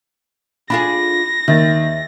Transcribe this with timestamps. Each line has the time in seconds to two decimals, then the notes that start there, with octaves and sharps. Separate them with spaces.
0.70 D4 F4 G#4 B5 A#6
1.48 D#2 D#3 E5 A6